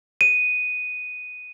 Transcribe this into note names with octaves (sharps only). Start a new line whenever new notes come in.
D#7